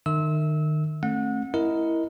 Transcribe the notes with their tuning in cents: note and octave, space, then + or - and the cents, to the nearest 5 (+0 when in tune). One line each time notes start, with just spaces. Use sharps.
D#3 -30 E5 -15 E6 -25
A3 +0 C#4 -45 F#5 -30
E4 +0 A#4 +0 D#5 +10